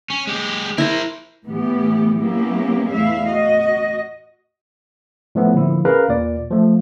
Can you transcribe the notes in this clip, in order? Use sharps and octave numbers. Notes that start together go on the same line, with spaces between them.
C#4
G#3 G4
E4 A#4 C5 A#5
A2 E3 B3 G4
F#3 A#3 B3 C#4 E4 G4
E2 A2 E4 E5 F5
F#4 D#5
A2 F3 A3 B3
A#2 D3 F3 E4
C#4 G#4 A#4 B4 F5
D#2 A#2 D5
F3 A3